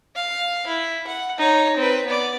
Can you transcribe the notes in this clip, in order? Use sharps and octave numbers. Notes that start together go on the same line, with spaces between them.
F5
E4
F#5
D#4 C#5
C4 B4
B3 D5